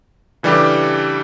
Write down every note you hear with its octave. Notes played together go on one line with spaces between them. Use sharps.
C#3 E3 G3 D4 G4 A4